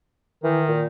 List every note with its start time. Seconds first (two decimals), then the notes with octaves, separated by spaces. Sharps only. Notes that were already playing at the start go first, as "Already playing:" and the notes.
0.44 D#3 E3
0.68 A#2